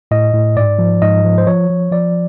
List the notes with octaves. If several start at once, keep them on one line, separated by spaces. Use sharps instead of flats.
A2 D#5
A2
G#2 D5
F3
G#2 D#5
F3
C5
F3 C#5
F3
F3 D5